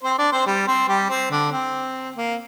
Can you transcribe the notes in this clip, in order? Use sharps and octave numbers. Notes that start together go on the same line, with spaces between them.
C4 C5
D4 D5
C4 C5
G3 G4
C4 C5
G3 G4
C4
D3 D4
C4
A#3